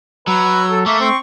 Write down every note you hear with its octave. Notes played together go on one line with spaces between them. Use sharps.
F#3 B4 E6
A4
A3 A#3 E5
C4 C#6